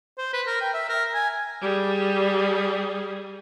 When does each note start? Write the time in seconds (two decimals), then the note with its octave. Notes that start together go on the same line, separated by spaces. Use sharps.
0.18 C5
0.33 B4
0.47 A#4
0.61 G5
0.74 E5
0.89 A#4
1.14 G#5
1.61 G3 G#4